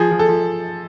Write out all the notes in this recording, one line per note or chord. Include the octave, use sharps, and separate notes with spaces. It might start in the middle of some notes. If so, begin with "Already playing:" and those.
Already playing: F3 G#4
F3
A4
F3